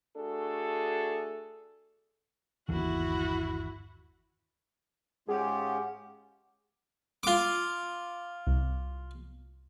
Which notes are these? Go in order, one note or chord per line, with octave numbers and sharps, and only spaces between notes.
A3 D4 F#4 G#4 A4
G1 D#2 E3 E4 F#4
G#2 G#3 C#4 F4 G4 G#4 F#5
F4 D6
C2